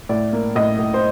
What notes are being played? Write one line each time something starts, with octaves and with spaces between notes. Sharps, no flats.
A2 D5
A#3
A2 D#5
A2
C5